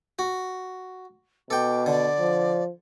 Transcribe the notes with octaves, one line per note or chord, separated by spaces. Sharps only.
F#4
B2 A4 G5 D6
D3 D5
F3